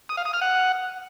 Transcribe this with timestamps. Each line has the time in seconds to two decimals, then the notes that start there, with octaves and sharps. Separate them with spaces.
0.09 D#6
0.17 F5
0.25 D#6
0.33 F6
0.41 F#5